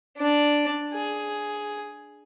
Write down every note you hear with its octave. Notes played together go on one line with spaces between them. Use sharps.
D4 D5
G#4